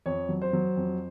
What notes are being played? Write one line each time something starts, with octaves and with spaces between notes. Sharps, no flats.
F2 C#5
F#3
C5
F#3
F2